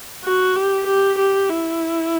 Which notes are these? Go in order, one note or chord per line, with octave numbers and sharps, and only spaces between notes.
F#4
G4
G4
G4
E4